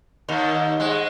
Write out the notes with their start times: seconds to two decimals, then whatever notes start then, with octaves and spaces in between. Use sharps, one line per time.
0.28 D#2 D#3
0.80 G#2 G#3